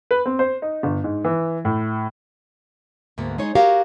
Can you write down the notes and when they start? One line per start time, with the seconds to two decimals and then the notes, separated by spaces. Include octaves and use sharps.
0.11 B4
0.26 C4
0.39 C5
0.62 D#4
0.83 G1
1.04 G#2
1.24 E3
1.65 A2
3.18 D2 G#2 A#3 B3
3.38 G#3 D#4 C#5
3.55 F#4 G4 A#4 C#5 F5